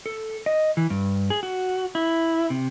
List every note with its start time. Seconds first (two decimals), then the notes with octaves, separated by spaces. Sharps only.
0.06 A4
0.46 D#5
0.77 E3
0.90 G2
1.30 G#4
1.43 F#4
1.95 E4
2.50 C3